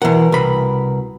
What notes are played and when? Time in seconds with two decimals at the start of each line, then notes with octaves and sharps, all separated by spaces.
0.02 B2 E3 A#4 F#5
0.32 C2 B5